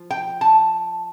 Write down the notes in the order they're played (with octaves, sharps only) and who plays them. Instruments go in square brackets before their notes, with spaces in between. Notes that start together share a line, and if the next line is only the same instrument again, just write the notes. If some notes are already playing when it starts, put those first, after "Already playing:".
Already playing: [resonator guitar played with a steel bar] F3
G5
A5